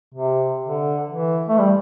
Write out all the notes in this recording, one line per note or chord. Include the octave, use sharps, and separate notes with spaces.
C3
D3
E3
A3
G3